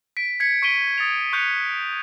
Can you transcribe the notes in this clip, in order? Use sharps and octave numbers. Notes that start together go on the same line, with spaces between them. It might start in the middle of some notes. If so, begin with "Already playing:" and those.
B6 D7
G#6 B6 C#7
C#6 B6 D7 D#7 G7
D#6 A6 C#7 F7
C#6 F#6 G6 C#7 F7